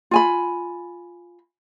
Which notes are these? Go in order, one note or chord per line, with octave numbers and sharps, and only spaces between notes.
F4 G#5 B5